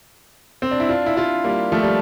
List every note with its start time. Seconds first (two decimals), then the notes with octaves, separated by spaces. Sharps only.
0.62 C4
0.71 D4
0.80 E4
0.89 D4 F4
1.06 E4
1.16 D4 F4
1.44 G3 A#3
1.72 F3 A3
1.83 G3